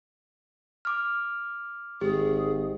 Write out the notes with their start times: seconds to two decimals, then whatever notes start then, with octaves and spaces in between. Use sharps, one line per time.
0.85 D6 F6
2.01 G#1 G4 G#4